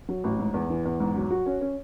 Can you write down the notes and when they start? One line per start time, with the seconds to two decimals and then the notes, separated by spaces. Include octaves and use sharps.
0.09 F#3
0.24 A1
0.39 G#2
0.54 E2
0.70 E3
0.85 E2
1.00 G#2
1.16 F#3
1.31 F#4
1.46 C#4
1.61 C#4